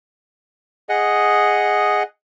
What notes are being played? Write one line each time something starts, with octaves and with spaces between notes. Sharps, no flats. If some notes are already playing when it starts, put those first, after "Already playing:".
G#4 D#5 F#5